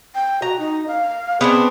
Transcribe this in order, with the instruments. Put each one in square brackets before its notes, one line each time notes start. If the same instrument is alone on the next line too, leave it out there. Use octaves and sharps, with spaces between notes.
[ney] G5
[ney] F#4 [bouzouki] A#5
[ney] D#4
F5
[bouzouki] B3 C4 D4 [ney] G#4